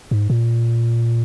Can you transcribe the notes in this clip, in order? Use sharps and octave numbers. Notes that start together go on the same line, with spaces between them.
G#2
A#2